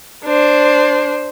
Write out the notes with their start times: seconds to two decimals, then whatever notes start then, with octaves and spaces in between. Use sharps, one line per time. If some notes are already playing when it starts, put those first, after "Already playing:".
0.25 D4 C5